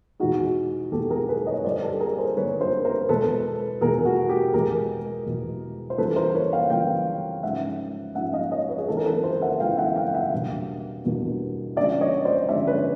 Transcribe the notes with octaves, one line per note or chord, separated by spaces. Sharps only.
E2 B2 G#3 B3 D#4 F#4 G#4
E2 B2 G#3 B3 D#4 G4 A4
G#4 A#4
A4 B4
C#5 D#5
G2 D3 G3 C5 D5
G4 A4
G#4 A#4
A#4 C5
G2 D3 G3 B4 C#5
A#4 C5
A#4 C5
E2 B2 G#3 A4 B4
E2 B2 G#3 G#4 A#4
F#4
G4
E2 B2 G#3 G#4 A#4
E2 B2 G#3
C5
C#3 E3 G3 A4 B4
A#4 C5
B4 C#5
F5 G5
C#3 E3 G3 F5 G5
G#2 F3 G#3 C#4 E5 F#5
G#2 F3 G#3 C#4 E5 F#5
D#5 F5
C#5 D#5
B4 C#5
G#4
C#3 E3 G#3 B3 E4 A4
A#4
A4 B4
A#4 C5
E5 F#5
C#3 E3 G#3 B3 E4 F5 G5
E5 F#5
F5 G5
E5 F#5
E2 B2 G3 A#3 D4
E2 B2 G3 A#3 D4
D3 F3 G#3 C#4 D5 E5
C#5 D#5
C5 D5
D3 F3 G#3 C#4 D5 E5
B4 C#5